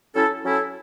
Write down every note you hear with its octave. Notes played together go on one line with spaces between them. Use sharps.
F#3 C#4 E4 A4
F#3 C#4 E4 A4